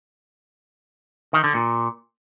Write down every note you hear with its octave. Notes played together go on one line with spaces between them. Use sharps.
D#3
D3
A#2